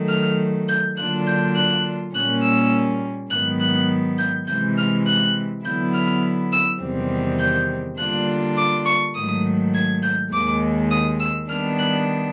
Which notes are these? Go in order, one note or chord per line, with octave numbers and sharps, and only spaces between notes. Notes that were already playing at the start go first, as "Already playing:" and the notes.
Already playing: D#3 F#3 A3
F6
G6
D3 F#3 A#3 D4 F4 F#6
G6
F#6
A#2 G3 A#3 C#4 F#6
E6
G#2 D#3 F#3 B3 F#6
F#6
G6
C3 E3 G#3 G6
F6
F#6
D3 F#3 B3 E4 G6
F6
E6
E2 C3 D#3 G3 C4
G6
D3 G3 A#3 D4 F4 F#6
D6
C#6
G#2 D#3 F#3 A3 D#6
G#6
G6
D#2 D#3 G#3 D6
D#6
E6
D#3 G3 B3 D4 F6
F#6